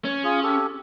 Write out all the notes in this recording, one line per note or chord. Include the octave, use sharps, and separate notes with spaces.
C#4
F4 G#4
G4 A4